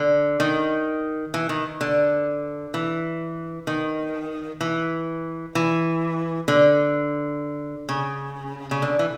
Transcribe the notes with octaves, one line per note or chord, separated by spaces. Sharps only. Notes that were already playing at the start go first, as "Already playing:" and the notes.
Already playing: D3
D#3
E3
D#3
D3
E3
D#3
E3
E3
D3
C#3
C#3
D3
E3